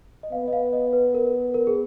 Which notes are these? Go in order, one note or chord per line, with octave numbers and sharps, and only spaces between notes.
D#5
B3 F5
D#5
F5
D#5
B4
A#4
A#4
G#4